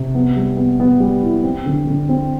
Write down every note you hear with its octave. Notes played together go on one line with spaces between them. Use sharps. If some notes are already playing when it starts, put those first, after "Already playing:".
Already playing: C3
B3
G3
B3
B3
G3
E4
C4
D3
D3
C4